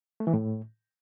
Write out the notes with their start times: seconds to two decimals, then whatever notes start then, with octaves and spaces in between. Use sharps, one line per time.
0.20 A3
0.27 E3
0.34 A2